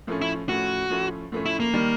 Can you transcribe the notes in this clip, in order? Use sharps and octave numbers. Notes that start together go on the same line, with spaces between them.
A2 F3 A3 C#4
E4
A2 F3 A3 C#4 F#4
A2 F3 A3 C#4
A2 F3 A3 C#4
E4
A#3
D#3 G3